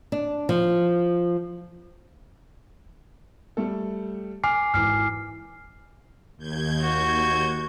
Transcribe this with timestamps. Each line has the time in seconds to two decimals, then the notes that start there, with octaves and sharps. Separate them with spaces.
0.12 D4
0.49 F3
3.57 G3 A3 A4
4.44 G#5 D6 F6 C7
4.74 G#1 E3 D6 F6 C7
6.37 D#2 G6 G#6
6.82 F#4